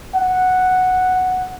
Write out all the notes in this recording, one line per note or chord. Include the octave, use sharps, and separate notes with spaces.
F#5